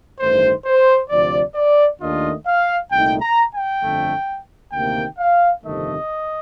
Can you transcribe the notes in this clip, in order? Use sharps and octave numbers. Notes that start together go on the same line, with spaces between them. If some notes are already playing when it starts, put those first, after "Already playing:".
A1 G2 D#3 A3 C5
C5
D2 C3 F3 D5
D5
D#2 D#3 A3 D4 F4 D#5
F5
C2 A#2 A3 D#4 G5
A#5
G5
G1 F2 D3 A3
D2 C3 D#3 A#3 G5
F5
G1 F2 C3 D#3 A3 D#5